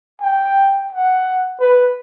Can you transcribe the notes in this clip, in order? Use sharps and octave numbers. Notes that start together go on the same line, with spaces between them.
G5
F#5
B4